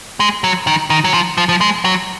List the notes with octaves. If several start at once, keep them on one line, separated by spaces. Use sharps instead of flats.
G#3
F#3
D#3
D#3
F#3
F3
F3
F3
G#3
F#3